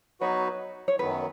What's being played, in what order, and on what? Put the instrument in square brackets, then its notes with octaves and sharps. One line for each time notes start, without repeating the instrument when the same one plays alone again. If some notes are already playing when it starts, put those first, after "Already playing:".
[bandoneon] F#3 B3 D#4 F#4 B4 [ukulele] C#5
[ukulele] C#5
[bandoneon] F#2 D#3 F#3 B3 [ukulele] B4